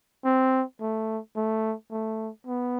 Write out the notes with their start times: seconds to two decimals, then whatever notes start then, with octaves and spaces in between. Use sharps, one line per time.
0.25 C4
0.81 A3
1.36 A3
1.91 A3
2.47 B3